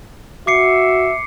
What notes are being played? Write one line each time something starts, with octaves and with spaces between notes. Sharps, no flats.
F#4 E5 D6 C7 C#7